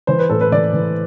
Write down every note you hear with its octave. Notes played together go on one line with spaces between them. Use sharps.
E3 C5
B4
A2 A4
B4
E3 D5
E3